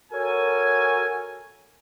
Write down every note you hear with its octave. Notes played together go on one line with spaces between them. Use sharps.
F#4 A4 A#4 C#5 G#5